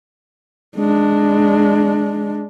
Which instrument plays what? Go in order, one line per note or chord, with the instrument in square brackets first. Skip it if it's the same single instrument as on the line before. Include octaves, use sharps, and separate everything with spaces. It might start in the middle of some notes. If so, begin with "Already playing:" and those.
[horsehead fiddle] G#3 D4